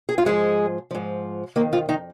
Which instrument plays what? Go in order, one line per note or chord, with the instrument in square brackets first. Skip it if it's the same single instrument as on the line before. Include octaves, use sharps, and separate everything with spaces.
[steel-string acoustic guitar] G#4
F4
G#2 F3 G#3 G#4
G#2 F3
D#3 A#3 A#4
F2
F3 F4
D#3 D#4